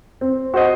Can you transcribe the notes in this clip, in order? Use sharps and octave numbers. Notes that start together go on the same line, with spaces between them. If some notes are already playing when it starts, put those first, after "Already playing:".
C4
F#4 C5 D#5